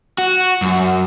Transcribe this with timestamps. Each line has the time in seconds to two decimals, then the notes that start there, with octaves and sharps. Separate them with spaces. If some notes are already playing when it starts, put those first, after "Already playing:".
0.18 F#4
0.62 F#2